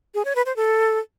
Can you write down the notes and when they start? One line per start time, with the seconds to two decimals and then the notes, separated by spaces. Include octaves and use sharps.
0.15 G#4
0.25 C#5
0.35 B4
0.46 C5
0.56 A4